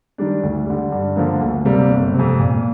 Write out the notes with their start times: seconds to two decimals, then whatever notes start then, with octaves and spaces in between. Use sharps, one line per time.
0.18 D#3 G3 D4
0.43 D2
0.67 D3 G3
0.92 G2
1.16 D3 F3 A#3 D4
1.41 D2
1.65 C3 G3 A#3
1.90 G1
2.14 C3
2.19 F2
2.39 A#2